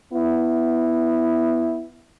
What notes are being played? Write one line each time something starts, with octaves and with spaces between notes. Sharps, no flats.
B3 E4